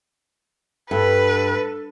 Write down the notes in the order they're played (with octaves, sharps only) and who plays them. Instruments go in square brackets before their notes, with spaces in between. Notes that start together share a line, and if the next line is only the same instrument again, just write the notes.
[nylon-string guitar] G2 [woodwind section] A4 [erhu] B4